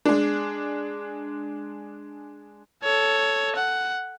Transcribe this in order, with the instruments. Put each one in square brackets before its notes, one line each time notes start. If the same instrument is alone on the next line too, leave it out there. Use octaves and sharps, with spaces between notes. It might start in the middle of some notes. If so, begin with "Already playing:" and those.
[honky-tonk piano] G#3 D4
[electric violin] A4 C#5
F#5